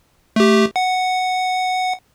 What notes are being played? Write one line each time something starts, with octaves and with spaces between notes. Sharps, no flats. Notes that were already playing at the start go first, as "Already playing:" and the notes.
A3 G4
F#5